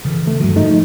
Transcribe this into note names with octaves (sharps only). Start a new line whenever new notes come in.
C#3 E3
A3
G2 D#3 F#3
G#2 F3 A3 D#4